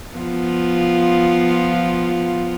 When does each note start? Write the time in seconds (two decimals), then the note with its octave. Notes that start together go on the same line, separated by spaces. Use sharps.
0.15 F3 B3 F4